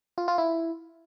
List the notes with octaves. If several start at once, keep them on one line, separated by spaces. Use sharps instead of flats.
F4
F4
E4